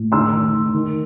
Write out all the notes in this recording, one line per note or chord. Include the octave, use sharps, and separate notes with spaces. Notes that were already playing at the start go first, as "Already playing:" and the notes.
Already playing: A2
D#3 C6 E6
D#3
D#3
D#3